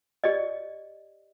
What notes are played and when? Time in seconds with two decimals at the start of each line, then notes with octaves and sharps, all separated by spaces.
0.24 G4 D5 D#5